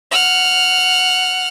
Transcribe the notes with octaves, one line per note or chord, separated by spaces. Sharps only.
F#5 F6